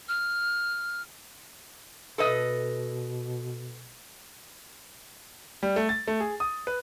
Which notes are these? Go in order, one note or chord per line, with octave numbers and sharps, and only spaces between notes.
F6
B2 A4 B4 D#5
G3
A3
A6
A3
G#4
D#6
B4